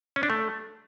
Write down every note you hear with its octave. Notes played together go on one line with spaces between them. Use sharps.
C#4
D4
A3